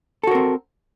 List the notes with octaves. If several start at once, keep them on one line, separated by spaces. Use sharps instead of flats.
C4 F#4 A4 A#4